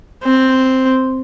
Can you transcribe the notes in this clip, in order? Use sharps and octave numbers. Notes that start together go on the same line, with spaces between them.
C4